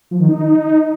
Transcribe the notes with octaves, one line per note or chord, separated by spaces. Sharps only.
F3
D#3
D#4